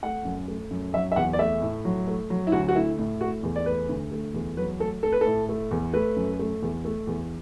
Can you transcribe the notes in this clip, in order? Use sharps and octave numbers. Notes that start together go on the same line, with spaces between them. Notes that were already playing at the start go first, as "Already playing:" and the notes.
A3 F#5
F#2
A3
F#2
F#3 E5
E5
E2 F#5
D5
A3 E5
A2
F#3
A3
F#3
E4
D2 F#4
F#4
A3 E4
A2
A3 F#4
E2
D5
A3 B4
D2
A3
E2
F#3 B4
A3 A4
A3 A4
B4
A2 A4
A3
E2
A3 B4
F#2
A3
E2
A3
E2